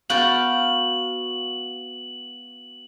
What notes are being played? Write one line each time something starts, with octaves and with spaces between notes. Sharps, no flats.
B3 F#4 F5 G5 A5 F#7